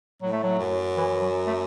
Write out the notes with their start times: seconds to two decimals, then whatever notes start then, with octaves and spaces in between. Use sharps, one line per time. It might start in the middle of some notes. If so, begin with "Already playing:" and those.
0.22 A2 F#3
0.32 A3
0.43 F#3
0.59 F#2
0.97 E3
1.21 F#3
1.47 A3